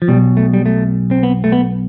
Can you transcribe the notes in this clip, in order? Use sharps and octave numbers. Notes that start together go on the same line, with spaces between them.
F3
B1 B2 G3
A3
G3
A3
C4
B3
A3
B3